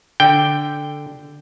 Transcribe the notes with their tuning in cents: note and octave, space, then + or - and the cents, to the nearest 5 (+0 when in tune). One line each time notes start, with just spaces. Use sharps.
D3 +0 G5 +0